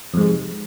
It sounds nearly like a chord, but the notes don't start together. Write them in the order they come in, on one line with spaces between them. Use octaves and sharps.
F2 G#2 G#3 C3